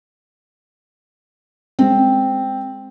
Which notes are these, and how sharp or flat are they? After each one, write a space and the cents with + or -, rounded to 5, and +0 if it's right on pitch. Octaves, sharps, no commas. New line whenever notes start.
G#3 +0 C4 +0